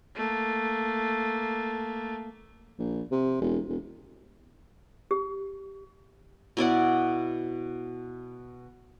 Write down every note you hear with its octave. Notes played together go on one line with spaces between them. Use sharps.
A3 A#3
A#1
C3
E1
E1
G4
B2 E4 D5 F#5